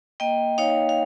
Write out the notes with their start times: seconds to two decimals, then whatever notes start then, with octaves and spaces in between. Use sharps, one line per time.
0.20 A#3 D#5 G5
0.58 D#4 C#5 F5
0.89 F5